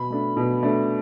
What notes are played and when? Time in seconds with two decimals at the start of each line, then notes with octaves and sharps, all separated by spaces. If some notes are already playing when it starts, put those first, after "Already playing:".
Already playing: B2 B5
0.10 A3 D4
0.37 B2
0.63 A3 D4